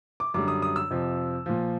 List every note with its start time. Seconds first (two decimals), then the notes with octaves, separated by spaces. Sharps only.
0.20 D6
0.34 F#2 D3 G3 D6
0.48 D#6
0.62 D#6
0.76 E6
0.90 F2 C3 F3
1.46 A#2 F3